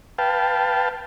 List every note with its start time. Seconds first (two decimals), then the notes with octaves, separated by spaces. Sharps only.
0.18 B4 F5 G5 A5